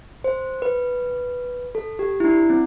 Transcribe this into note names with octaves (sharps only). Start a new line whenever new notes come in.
C5
B4
A4
G4
E4
D4
C4